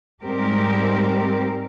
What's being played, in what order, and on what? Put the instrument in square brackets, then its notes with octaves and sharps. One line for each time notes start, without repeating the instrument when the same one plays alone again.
[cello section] G#2 G3 C4 G4 A#4